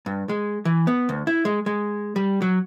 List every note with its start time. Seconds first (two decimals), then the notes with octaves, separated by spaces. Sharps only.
0.06 G2
0.29 G#3
0.65 E3
0.87 B3
1.09 D2
1.27 E4
1.45 G#3
1.66 G#3
2.16 G3
2.42 F#3